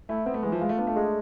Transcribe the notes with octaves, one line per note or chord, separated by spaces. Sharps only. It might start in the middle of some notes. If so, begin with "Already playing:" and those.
A3 E4
B3 C4
A3
E3 G#3
F3
G#3 F4
A3
B3 D4
A3
G#3